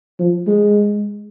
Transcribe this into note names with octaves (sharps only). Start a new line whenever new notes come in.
F3
G#3